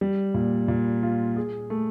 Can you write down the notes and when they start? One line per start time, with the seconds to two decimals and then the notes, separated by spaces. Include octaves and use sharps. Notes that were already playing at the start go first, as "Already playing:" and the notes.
0.01 G3
0.34 A#2
0.68 A#2
1.03 F4
1.36 G#4
1.70 A3